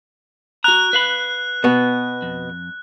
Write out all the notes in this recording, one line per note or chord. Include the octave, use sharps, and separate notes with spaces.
F#4 A#5 F#6
B4 F5 B5
B2 B3
F2